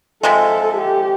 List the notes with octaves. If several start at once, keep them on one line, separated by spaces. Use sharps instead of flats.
C3 F3 G#3 A4
G4